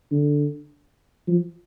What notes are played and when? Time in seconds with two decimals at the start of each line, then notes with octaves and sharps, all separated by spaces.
0.11 D3
1.27 F3